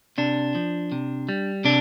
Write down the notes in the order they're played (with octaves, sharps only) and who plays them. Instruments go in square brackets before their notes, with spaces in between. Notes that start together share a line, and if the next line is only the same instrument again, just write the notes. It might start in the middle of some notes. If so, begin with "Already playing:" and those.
[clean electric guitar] C3 D4
F3
C3
G3
C3 D4